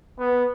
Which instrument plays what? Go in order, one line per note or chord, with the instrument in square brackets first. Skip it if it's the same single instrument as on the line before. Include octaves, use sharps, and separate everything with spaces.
[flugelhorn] B3